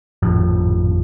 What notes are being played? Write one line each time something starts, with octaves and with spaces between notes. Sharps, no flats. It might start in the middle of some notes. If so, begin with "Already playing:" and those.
G#1 F2 A2 F3